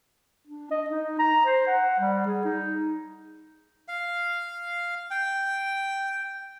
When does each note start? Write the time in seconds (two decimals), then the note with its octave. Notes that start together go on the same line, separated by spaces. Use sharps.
0.48 D4
0.71 D#5
0.90 D#4
1.19 A#5
1.46 C5
1.67 F#5
2.00 G3
2.27 G#4
2.45 D#4
3.88 F5
5.11 G5